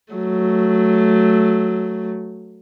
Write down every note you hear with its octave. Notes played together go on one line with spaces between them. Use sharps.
F#3 A3